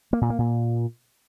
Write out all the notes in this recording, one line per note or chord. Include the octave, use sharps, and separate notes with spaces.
A#3
A#2
A#3
A#2